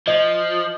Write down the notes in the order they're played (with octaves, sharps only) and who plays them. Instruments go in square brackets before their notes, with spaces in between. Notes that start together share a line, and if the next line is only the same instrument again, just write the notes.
[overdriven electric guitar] F3 [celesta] D#5